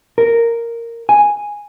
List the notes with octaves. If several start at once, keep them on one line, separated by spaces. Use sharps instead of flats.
A#4
G#5